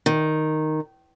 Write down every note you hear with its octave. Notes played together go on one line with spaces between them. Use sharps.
D#3